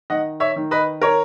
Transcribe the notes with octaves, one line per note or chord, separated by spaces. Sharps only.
D#3 D#5 F#5
C#5 E5
D#3
B4 D#5
A#4 C#5